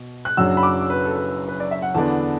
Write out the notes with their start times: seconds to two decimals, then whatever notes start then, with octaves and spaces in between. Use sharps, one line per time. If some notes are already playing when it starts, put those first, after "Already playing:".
Already playing: B2
0.25 F#6
0.37 F#1 F#2 F#3 D4 F#4 E6
0.57 B5
0.63 D6
0.90 B4
1.05 A4
1.15 B4
1.48 B4
1.60 D5
1.71 E5
1.82 F#5
1.95 E2 D3 B3 D4 A5